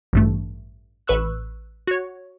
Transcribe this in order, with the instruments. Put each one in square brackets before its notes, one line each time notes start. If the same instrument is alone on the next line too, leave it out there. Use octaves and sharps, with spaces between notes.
[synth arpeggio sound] A1 G2 A3
A1 B4 C#6 E6 F#6
F#4 C#5